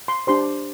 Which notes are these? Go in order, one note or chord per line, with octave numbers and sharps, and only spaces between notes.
C6
D4 G4 C5 C6